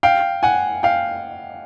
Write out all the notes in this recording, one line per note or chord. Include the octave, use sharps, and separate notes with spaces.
F5 G5
F#5 G#5
F5 G5